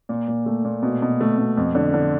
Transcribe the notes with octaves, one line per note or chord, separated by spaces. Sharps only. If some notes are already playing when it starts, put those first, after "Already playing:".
A#2
A#2
A3
A#2
B2
B2
A3
B2
F2
D3
D3